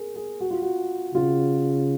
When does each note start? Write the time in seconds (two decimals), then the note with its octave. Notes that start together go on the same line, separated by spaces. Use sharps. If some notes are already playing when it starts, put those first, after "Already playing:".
Already playing: G#4 A#4
0.16 G#4
0.40 F#4
0.50 F4
0.62 F#4
1.14 C#3 F4